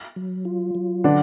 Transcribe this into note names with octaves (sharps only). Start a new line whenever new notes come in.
F#3
F4
F#3
D3 D4